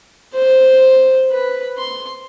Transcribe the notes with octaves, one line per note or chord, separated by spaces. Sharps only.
C5
B4
C6